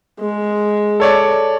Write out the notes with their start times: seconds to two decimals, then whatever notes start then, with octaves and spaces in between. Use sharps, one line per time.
0.20 G#3
1.00 A4 C#5 D5